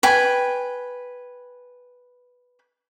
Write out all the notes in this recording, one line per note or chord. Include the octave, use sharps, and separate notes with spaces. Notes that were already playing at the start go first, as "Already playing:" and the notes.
B4 G5 G#5